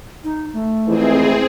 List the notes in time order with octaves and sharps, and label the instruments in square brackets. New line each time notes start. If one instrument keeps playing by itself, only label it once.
[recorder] D#4
A3
[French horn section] F2 G#2 E3 [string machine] C4 G#4